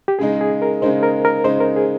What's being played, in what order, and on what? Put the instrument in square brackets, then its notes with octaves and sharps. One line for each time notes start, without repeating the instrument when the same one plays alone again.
[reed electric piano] G4
[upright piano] C#3 G#3 D#4 [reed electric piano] G#4
[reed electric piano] G#4
A#4
[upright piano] C#3 G#3 D#4 [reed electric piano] C5
[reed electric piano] A#4
A#4
[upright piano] C#3 G#3 D#4 [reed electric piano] C5
[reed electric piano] A#4
G#4